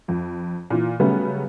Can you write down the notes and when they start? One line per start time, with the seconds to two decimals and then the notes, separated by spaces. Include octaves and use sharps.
0.08 F2
0.70 A#2 E3
1.00 C#3 F#3 G3 A3 B3 C#4